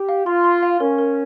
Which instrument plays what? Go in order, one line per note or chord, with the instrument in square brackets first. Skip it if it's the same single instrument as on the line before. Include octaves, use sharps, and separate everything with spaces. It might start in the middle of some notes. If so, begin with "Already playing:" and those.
Already playing: [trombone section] G4
[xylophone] F5
[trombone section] F4 [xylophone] C6
[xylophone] C6
F5
[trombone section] C#4 [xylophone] A#4
[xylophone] A#4